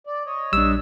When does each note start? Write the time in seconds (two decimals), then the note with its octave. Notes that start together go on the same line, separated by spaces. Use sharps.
0.07 D5
0.26 C#5 D#5
0.53 A#1 G3 D4 E6